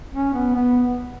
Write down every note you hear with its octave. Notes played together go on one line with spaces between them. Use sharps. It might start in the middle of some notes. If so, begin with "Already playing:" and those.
C#4
B3
B3